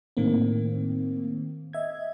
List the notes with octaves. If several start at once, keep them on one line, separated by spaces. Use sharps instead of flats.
A2 D#3 A#3 C4
D#5 E5 G#6